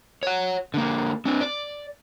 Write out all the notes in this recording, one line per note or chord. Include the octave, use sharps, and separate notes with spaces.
C#5 F#5
D3 A#3
C4 D4
D5